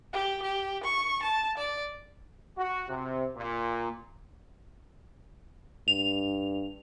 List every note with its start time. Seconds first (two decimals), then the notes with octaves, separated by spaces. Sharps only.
0.13 G4
0.42 G4
0.84 C#6
1.23 A5
1.57 D5
2.57 F#4
2.89 C3
3.36 A#2
5.88 G2 F7